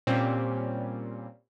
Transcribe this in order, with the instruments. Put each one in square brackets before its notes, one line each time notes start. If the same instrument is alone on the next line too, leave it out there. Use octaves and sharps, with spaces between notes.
[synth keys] A#2 G3 C4 C#4